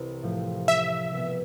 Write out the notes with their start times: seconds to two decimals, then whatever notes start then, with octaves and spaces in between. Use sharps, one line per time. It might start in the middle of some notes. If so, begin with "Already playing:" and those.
Already playing: C2 C3 E3
0.23 A2 F3 A3
0.68 E5
1.13 C2 B2 B3